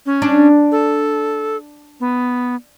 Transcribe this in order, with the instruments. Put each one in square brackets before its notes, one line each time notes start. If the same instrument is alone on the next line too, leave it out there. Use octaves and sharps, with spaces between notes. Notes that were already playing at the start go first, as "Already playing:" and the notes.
[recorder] C#4
[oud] D4
[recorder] A4
B3